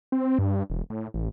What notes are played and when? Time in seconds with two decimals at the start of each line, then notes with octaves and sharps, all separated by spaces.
0.12 C4
0.39 G2
0.70 E1
0.90 A2
1.14 A1